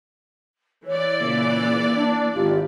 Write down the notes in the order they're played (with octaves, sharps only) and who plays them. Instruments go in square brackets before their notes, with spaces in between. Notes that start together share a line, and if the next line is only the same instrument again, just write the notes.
[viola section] E3 D5 [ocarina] C#5
[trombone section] A#2 C#3 [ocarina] A#3
[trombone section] D4
[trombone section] G#1 F4 [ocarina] G4